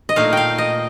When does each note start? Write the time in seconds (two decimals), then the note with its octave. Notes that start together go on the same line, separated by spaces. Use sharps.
0.09 D#5
0.16 A#2 A3 D#4 F5
0.33 F5 G5
0.58 D#5